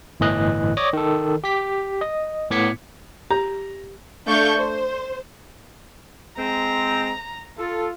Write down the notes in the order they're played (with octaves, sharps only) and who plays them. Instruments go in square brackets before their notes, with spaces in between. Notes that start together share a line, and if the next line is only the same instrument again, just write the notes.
[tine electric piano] G1 A2 E3 D#5 F#6
C#5 D5 D6 D#6 A#6
D#3 A4
G4 B6
D#5
A2 B3 D6 G#6 B6 C#7
[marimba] G4 [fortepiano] A#5
[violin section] A3 D4 F5 C#6 G6
C5
[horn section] G#3 C4 [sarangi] A#5
[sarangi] F4 [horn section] A4